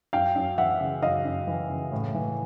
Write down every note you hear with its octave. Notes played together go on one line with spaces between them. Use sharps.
F#2 F5 G5
F#2
E3 E5 F#5
C#3
F#2 D#5 F5
F#2
E3
C#3
A2
E3